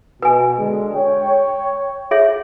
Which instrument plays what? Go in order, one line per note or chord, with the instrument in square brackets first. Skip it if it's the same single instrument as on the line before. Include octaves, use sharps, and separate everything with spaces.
[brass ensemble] B2 [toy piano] B4 G#5
[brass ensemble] D3 G#3
C#5 G5
[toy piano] G#4 C#5 E5